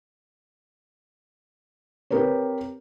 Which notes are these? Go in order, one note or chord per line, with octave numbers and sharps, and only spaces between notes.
C4 G4 A#4 B4 C#5